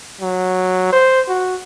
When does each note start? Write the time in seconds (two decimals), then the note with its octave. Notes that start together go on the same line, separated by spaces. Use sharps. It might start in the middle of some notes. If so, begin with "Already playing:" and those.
0.21 F#3
0.93 C5
1.29 F#4